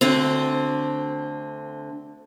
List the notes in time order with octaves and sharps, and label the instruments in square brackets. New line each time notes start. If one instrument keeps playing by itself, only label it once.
[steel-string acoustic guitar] D2 D3 C4